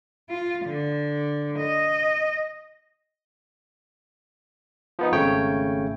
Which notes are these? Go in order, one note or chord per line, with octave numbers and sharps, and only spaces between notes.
F4
D3
D#5
F3 B3 D#4
G#1 C#3 A3 C#5 G5